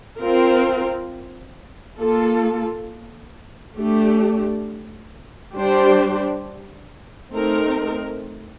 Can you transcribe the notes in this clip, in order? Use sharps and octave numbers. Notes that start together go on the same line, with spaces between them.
C4 F4 A#4
A#3 F4 A4
A3 D4 G4
G3 D4 G4 C5
A3 C4 D#4 A#4